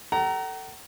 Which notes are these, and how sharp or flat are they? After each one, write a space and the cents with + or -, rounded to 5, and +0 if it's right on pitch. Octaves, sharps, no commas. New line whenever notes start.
A4 +20 F#5 +45 A#5 +0